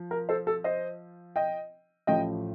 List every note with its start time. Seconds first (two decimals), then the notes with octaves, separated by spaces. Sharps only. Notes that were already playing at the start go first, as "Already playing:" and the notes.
Already playing: F3
0.11 A#4
0.29 A4 C5
0.47 A4
0.64 C5 D#5
1.36 D#5 G5
2.07 A1 A2 F3 D#5 G5